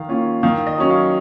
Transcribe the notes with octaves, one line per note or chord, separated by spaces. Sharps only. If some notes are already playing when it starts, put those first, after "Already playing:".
Already playing: D#3 F5
A#3 C#4 F4
D#3 F5
D#5
F#3 C#4
F5